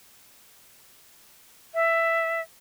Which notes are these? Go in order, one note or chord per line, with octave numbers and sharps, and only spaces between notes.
E5